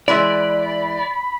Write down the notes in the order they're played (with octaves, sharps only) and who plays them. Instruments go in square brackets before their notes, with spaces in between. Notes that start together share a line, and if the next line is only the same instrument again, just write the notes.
[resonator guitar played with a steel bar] E3 G#3 E5 [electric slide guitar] D5 [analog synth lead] B5